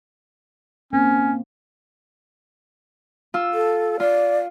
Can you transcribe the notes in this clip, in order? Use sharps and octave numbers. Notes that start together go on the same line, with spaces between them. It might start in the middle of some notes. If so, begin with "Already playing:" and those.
A#3 C4 C#4
F4 E6
A4
F4 D5